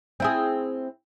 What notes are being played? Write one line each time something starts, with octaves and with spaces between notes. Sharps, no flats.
C4 E4 G#4